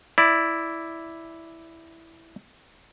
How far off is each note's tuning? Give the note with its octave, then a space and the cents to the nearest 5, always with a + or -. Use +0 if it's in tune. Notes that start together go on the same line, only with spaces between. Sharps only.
E4 +0 D5 +0